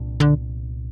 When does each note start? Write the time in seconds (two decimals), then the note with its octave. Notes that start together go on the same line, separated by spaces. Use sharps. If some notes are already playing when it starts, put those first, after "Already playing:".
Already playing: C2 A#2 D4
0.20 D3